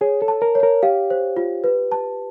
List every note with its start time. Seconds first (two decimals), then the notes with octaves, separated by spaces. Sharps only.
0.01 G#4 C#5
0.22 A4
0.28 A5
0.42 A#4
0.55 C#5
0.63 A#4
0.83 G4 F5
1.10 C5
1.36 F4
1.64 B4
1.92 A5